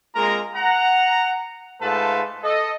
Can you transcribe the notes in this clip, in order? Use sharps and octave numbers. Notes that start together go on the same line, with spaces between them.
G#3 A#3 C4 F4 A#4 A#5
F#5 A#5
G#2 A3 F4 A4 B4 A5
A4 D#5